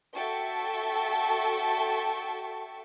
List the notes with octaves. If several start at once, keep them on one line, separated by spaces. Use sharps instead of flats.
F#4 A4 E5 G5 A5 C#6